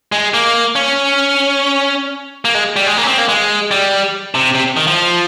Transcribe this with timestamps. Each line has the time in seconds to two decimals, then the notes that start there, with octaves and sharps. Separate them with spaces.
0.12 G#3
0.34 A#3
0.76 C#4
2.45 A#3
2.55 G#3
2.76 G3
2.86 G#3
2.97 A#3
3.03 C#4
3.08 C4
3.18 A#3
3.29 G#3
3.71 G3
4.35 C3
4.55 C3
4.77 D#3
4.88 F3